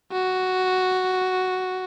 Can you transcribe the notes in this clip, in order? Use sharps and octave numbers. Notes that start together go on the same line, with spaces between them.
F#4